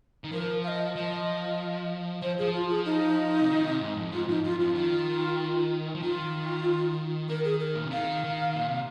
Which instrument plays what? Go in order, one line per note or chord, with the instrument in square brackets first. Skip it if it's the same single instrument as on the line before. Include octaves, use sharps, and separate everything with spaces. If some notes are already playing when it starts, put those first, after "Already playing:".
[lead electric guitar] D#3
[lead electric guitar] F3 [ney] A#4
[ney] F5
D#5
[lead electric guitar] F3 [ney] D#5
[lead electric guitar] F3 [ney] C5
[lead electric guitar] F3 [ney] G#4
[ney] F4
G#4
D#4
[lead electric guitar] C3
D#3
C3
G#2
F2
[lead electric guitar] G#2 [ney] F4
[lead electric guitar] F2 [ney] D#4
[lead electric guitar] F2 [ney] F4
[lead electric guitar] F2 [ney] F4
[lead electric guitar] D#3 [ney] F4
[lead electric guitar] F3
[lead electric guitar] D#3 [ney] F4
[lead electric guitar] D#3 [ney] A#4
[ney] G#4
A#4
[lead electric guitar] A#2
C3
[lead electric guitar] D#3 [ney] F5
[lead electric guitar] D#3
A#2
C3